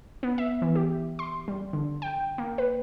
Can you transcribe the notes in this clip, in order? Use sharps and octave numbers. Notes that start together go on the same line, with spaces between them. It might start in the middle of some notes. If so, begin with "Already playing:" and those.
B3
E5
E3
G4
C6
G3
D3
G5
A#3
B4